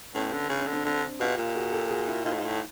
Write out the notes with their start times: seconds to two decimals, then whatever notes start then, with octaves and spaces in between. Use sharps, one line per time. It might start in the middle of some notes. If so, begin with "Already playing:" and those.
0.15 A2 B3 C#4
0.33 D3
0.50 C#3 D4
0.61 C#4
0.67 D3
0.73 C4 D4
0.85 D3 C4 D4
1.19 B2 F4 G4
1.37 A#2
1.55 F#4 G#4
1.72 G4 A4
1.89 F#4 G#4
2.07 E4 F#4
2.25 A#2 D#4 F4
2.33 A2
2.39 G#2
2.46 A2